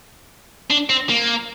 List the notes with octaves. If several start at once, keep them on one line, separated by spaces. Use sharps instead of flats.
D4
C4
A#3